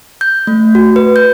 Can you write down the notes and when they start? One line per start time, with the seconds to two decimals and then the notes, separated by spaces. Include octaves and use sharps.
0.21 G6
0.47 A3
0.75 F#4
0.96 B4
1.16 G6